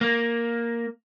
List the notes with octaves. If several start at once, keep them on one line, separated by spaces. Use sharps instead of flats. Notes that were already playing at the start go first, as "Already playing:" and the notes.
A#3